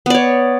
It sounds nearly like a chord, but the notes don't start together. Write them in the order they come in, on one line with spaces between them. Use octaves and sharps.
B3 D5 C#5